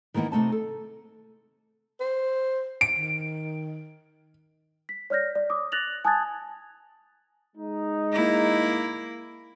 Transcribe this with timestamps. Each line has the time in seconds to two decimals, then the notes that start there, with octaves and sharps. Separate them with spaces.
0.14 D#3 E3 A#3 B3 D#4
0.32 C3 A3 D#4 A5
0.52 A4
2.00 C5
2.81 D7
2.98 D#3
4.89 B6
5.10 C#5 D5 F6 G6 A#6
5.35 D5
5.50 D6 D#6
5.72 F#6 A6 A#6 F7 F#7
6.05 G#5 A5 D#6 F#6 G#6 A6
7.56 G#3 D#4
8.13 A#3 E4